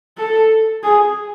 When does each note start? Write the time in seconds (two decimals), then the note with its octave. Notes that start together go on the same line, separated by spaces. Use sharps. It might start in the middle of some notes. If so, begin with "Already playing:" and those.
0.18 A4
0.83 G#4